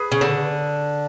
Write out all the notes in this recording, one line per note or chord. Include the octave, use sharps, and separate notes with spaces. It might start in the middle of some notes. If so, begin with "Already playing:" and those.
Already playing: G#4 B4
C#3
D3